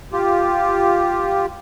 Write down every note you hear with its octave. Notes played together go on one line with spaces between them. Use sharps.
F4 G4